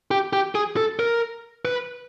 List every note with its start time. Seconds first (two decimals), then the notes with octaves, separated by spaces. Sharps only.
0.11 G4
0.33 G4
0.55 G#4
0.77 A4
0.99 A#4
1.65 B4